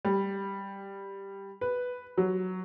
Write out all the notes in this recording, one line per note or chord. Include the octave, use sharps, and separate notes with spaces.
G3
B4
F#3